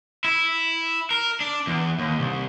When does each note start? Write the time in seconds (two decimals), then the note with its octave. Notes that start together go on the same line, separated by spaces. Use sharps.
0.24 E4
1.11 A#4
1.40 D4
1.67 E2
1.99 D#2
2.20 C2